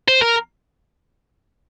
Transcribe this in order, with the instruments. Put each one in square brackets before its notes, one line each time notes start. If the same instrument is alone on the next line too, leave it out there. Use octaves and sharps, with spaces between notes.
[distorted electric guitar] C5
A#4